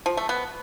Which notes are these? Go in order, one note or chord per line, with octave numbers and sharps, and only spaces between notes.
F3
A3
B3